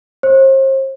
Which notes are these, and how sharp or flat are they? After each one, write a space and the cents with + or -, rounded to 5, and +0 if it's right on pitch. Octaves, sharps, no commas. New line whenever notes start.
C5 +40